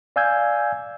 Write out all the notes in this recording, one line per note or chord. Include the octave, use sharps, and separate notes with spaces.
D5 F5 G#5 E6 G6 G#6